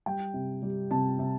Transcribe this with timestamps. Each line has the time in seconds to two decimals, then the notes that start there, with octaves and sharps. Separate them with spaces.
0.06 G3 G5
0.34 C3
0.62 G3
0.91 C3 A5
1.19 C3